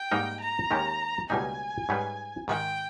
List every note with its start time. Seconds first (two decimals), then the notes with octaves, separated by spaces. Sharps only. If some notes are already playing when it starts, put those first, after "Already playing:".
Already playing: G5
0.11 G#2 G3 A#3 D#4 A#4
0.41 A#5
0.71 D#2 D#3 G#3 C#4 G4
1.30 C#2 B2 G3 A#3 D#4 G#5
1.89 G#2 G3 C#4 G#4 B4
2.48 G#2 D#3 G#3 G5